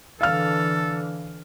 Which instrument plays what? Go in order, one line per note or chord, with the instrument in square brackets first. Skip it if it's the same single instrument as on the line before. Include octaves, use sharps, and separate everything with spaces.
[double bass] D3 E3 [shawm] A4 [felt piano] F5 F6